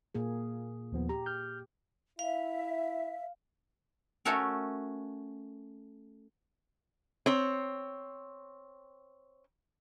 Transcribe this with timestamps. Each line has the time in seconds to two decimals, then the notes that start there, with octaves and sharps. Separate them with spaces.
0.15 A#2 A#3 G#4
0.92 D#2 F3 B3
1.09 G4 A#5
1.26 F6 G6
2.19 E4 E5 F5
4.25 A3 C#4 F#4 A4 A#4
7.26 C4 C#5